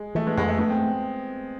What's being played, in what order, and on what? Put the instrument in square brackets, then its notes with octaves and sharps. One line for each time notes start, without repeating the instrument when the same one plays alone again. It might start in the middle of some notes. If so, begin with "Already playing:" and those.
Already playing: [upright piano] G#3
[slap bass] E3 [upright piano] A3
[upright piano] G#3 B3
[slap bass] F2 [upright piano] G#3 B3
[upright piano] A3
[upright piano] G#3 B3 [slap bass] A3
[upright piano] C4